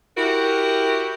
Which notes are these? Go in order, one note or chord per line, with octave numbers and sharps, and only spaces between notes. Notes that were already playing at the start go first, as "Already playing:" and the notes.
E4 F#4 G4 A#4